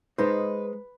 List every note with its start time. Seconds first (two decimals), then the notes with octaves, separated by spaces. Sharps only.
0.18 G#3 D#4 B4 C5